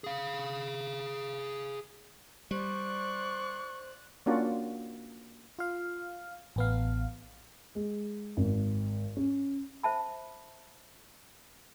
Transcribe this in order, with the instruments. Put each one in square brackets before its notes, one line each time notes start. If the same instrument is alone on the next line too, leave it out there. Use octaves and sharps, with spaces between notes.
[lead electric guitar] G#4 F5
[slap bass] G3 [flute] C5 [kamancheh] D5 F#6 [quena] C#6
[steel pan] A#3 C#4 D4 F4 F#4 D5
[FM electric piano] F4 F5
A1 B3 F5
[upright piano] G#3
G#1
C#4
[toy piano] C5 E5 A5 B5